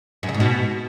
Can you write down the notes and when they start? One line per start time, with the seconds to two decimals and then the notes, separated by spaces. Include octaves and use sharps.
0.23 F#2
0.29 C#3
0.34 G#2
0.40 B2